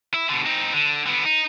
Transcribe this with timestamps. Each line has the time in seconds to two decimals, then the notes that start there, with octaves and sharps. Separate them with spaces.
0.14 E4
0.30 B2 D3
0.46 C4 D#4
0.73 D3
1.06 D3 B3
1.26 D#4